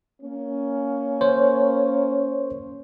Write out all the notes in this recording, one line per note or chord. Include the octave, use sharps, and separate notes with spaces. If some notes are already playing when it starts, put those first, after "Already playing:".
A#3 C#4
C5 C#5